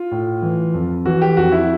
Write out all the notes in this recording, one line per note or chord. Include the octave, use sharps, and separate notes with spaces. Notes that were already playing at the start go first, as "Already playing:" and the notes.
Already playing: F4
A2
E3
F2
E3 F#4
G4
F2 F#4
E4